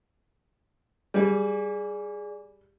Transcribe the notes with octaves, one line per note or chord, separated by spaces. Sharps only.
G3 G#4 D5